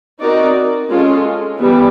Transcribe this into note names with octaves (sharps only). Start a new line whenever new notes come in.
C4 D#4 F#4 A#4 D5
G#3 C#4 F4 A4
E3 G3 B3